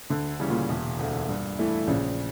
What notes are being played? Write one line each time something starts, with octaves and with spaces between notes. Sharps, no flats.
D2 D3
C#3 E3 G3 C#4
A#2
E1
D2 D3
G2
E3 A3 E4
A#1 C#3